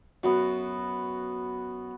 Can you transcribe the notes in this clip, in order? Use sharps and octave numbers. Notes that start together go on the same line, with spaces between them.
F#2 B3 F#4